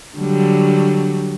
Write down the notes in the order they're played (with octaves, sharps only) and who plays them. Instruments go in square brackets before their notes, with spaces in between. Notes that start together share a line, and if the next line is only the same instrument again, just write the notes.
[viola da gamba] D3 F#3 G3